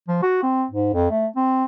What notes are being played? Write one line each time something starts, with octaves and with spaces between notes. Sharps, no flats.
F3
F#4
C4
G#2
F2
A3
C4